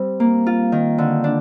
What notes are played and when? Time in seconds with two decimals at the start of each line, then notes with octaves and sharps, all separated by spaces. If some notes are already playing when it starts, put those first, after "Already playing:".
Already playing: G3 C4
0.20 A#3
0.47 F4
0.72 D#3
0.98 D3
1.24 D4